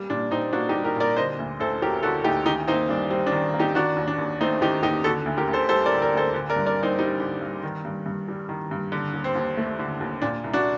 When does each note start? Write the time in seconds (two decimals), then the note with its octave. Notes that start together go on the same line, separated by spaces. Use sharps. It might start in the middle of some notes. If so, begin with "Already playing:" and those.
Already playing: G3 A#3
0.10 A#2 D4
0.31 A#2 C4 D#4
0.53 A#3 D4 F#4
0.69 D#4 G4
0.74 G3
0.84 G4 A#4
0.96 A#2 A#4 D5
1.17 D3 C5 D#5
1.39 D2
1.60 D2 A4 C5
1.82 F#3 G4 A#4
2.03 D3 F#4 A4
2.24 D2 D#4 G4
2.46 D#3 D#4 G4
2.67 A#3 C4 D#4
2.89 G2 D4
3.10 G3 C4
3.27 D4
3.32 D#3
3.54 A#3
3.59 D#4 G4
3.75 D#3 D4 F#4
3.97 D#2
4.08 D4
4.18 D#2
4.40 A3 C4 D#4
4.61 D#3 D#4 G4
4.83 D#2 D#4 G4
5.04 D3 F#4 A4
5.26 D2
5.37 G4 A#4
5.47 D2
5.53 A4 C5
5.69 G3 A4 C5
5.86 A#4 D5
5.91 D3
6.02 A#4 D5
6.13 D2 A4 C5
6.34 D3
6.50 A#4 D5
6.56 G2
6.66 A#4 D5
6.77 G2
6.83 C4 D#4
6.99 G3 C4 D#4
7.20 D3
7.41 G2
7.63 D#3
7.85 G2
8.06 G2
8.29 G3
8.49 D#3
8.71 G2
8.92 D3
9.13 D#2
9.24 C4
9.35 D#2
9.57 A3
9.79 D3
10.01 D#2
10.22 A#2 D4
10.44 C2
10.53 D4 F#4